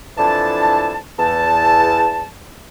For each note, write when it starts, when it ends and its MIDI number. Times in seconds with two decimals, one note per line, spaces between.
0.18 0.98 41
0.18 0.98 52
0.18 0.98 62
0.18 0.98 64
0.18 0.98 81
1.19 2.26 40
1.19 2.26 81